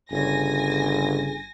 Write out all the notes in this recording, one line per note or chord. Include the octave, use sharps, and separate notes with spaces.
G1 C#3 G#5 A#6